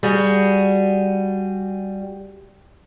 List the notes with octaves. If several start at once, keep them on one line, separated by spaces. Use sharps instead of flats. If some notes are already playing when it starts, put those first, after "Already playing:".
G3 F#4 G#4